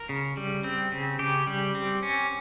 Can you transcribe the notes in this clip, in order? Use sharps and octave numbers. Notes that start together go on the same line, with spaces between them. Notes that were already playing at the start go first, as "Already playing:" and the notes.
Already playing: A#4
C#3
G3
C4
C#3
C#3 G4
G3
C4
C#4